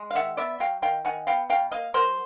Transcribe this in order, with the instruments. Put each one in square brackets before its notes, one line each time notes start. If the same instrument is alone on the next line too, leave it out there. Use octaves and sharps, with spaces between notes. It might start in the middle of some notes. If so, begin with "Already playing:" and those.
Already playing: [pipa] G#3
F5
D#3 E5 F#5
B3 D5 E5
F#3 F5 G5
D#3 F5 G5
D#3 F#5 G#5
B3 F5 G5
B2 F5 G5
A#3 D#5 F5
F#3 A#4 C5